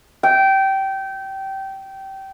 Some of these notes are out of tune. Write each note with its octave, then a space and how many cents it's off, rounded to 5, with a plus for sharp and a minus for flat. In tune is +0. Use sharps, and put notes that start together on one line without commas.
G5 -20